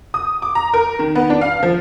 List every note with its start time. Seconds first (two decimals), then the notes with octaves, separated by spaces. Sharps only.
0.14 D#6
0.42 D6
0.55 A#5
0.74 A#4
0.99 D#3
1.15 B3
1.30 D4
1.41 F5
1.63 F3